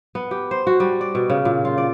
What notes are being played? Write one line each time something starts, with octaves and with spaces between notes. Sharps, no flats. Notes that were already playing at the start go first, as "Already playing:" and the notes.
B3
G4
C5
F#4
G3
D5
B2
C#3
A#2
F4
D5